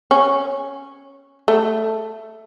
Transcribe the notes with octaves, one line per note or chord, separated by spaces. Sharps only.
C#4
A3